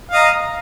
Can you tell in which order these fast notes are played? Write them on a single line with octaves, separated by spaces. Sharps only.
F5 D#5 A#5